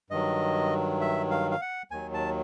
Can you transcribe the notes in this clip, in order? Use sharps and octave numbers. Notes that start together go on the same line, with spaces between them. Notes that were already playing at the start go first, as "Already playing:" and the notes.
G2 D#3 F#3 D#5
E5
F5
F5
F#5
D#2 D#3 F#3 G#5
A5